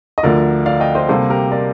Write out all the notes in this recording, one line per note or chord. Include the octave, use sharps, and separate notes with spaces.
D#5
D2 D3 F3 A#4 D5
D5 F5
D#5 G5
C5 D#5
C3 G3 A#3 A4 C5
G4 A#4
A#4 D5